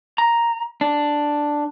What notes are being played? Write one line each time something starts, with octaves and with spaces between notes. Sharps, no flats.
A#5
D4